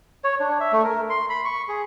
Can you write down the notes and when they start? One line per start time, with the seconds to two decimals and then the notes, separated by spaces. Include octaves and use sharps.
0.24 C#5
0.40 D4
0.60 E5
0.72 A3
0.84 A#4
1.10 C6
1.29 B5
1.45 C#6
1.69 G#4